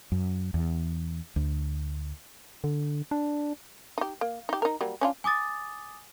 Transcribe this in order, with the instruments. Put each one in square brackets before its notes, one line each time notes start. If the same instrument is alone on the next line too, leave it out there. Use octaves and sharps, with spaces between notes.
[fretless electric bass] F#2
E2
D2
[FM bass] D3
D4
[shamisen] D#4 G4
A#3
D#4 G4
D#4 A#4
F#3 G3 A#3
C#4 D4 F4
[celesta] G#5 D6 D#6 A6